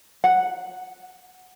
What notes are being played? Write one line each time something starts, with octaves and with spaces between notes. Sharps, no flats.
F#5